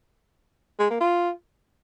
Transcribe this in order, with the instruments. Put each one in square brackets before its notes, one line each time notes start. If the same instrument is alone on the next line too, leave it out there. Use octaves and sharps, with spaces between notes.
[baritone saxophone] G#3
A#3
F4